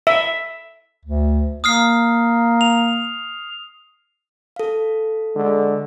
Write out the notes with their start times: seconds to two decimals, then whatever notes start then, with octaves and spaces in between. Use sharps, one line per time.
0.07 E5
1.05 D2
1.64 A#3 D#6 F6 C7
2.61 F7
4.56 A4 F5
5.36 D3 G#3